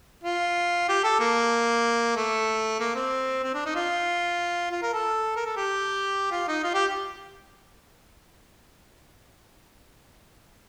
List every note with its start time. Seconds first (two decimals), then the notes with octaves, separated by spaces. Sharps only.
0.24 F4
0.89 G4
1.04 A4
1.20 A#3
2.16 A3
2.80 A#3
2.95 C4
3.43 C4
3.54 D4
3.66 D#4
3.75 F4
4.71 F4
4.82 A#4
4.93 A4
5.36 A#4
5.46 A4
5.56 G4
6.31 F4
6.48 D#4
6.64 F4
6.74 G4